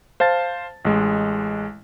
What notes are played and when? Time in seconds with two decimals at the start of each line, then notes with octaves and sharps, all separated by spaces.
0.20 C5 F5 A5 A6
0.85 A1 G#3